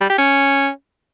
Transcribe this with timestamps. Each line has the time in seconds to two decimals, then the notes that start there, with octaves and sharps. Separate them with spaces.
0.01 G3
0.10 G4
0.18 C#4